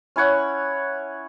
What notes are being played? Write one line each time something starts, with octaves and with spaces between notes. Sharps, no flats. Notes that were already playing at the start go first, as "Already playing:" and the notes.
C#4 E4 C#5 F#5